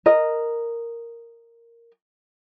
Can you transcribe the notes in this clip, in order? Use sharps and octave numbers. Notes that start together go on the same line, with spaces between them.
A#4 D#5